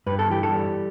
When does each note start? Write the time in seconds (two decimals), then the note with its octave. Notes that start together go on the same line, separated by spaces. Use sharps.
0.06 G2 B4
0.19 A4
0.30 E3 G4
0.43 A4
0.52 G3